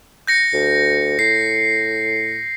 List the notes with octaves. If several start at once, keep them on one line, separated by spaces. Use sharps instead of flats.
G6 A#6 C#7
D2
A2 C7